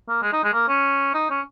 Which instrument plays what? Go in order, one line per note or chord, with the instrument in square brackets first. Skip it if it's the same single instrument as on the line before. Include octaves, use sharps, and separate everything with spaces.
[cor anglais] A#3
G#3
D#4
G#3
A#3
C#4
D#4
C#4